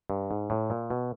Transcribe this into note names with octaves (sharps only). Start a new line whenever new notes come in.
G2
G#2
A2
A#2
B2